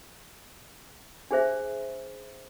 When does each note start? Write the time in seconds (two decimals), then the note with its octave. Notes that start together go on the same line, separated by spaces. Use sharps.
1.31 D4 G#4 C5 E5